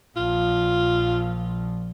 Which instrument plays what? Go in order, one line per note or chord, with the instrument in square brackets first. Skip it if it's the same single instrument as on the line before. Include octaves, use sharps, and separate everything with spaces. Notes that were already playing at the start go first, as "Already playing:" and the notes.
[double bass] A#1 F3 [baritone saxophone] F4